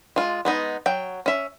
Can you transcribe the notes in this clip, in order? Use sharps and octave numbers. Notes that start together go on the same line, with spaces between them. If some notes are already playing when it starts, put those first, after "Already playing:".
G#3 F4
G#3 B3 D#4
F#3 G5
C#4 E5